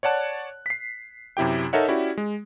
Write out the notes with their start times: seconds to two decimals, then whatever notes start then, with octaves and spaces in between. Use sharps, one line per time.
0.03 C#5 D5 F#5 A5 F#6
0.66 B6 C7
1.37 F#2 C3 E4 G4 G5
1.73 D#4 A4 A#4 C#5 E5 F#5
1.88 C#4 E4 F#4 G4 D5
2.17 G#3